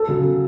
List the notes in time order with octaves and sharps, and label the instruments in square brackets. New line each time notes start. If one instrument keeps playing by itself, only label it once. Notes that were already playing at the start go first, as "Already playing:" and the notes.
Already playing: [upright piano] A4
[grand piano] C#3 F#3